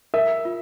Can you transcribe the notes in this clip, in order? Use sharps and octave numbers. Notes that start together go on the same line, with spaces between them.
A#4 E5
F4